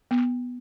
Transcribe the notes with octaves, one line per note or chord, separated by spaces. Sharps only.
B3